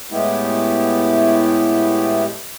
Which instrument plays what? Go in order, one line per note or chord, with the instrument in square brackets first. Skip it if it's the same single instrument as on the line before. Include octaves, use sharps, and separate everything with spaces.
[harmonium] A2 G#3 A3 B3 E4 G4